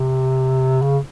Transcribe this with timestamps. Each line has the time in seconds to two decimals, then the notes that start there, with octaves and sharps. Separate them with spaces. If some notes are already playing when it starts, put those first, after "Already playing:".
Already playing: C3
0.82 C#3